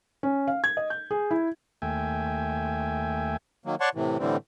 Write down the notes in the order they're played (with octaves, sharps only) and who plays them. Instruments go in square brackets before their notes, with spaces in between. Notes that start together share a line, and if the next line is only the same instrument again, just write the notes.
[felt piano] C#4
F5
G#6
D#5
G6
G#4
E4
[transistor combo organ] D#2 A3 E5 G5 G#5
[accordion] D#3 F#3 A#3
C#5 D5 F#5 A5 C6 C#6
A2 C3 E3
A2 D3 E3 G3 C4